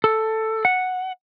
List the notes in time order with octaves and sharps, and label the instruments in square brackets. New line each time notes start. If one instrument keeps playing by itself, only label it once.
[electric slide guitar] A4
F#5